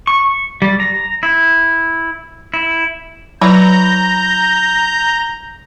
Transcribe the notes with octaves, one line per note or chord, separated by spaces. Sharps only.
C#6
G3
A#5
E4
E4
F#3 E4 B4 C#5 A#5 G6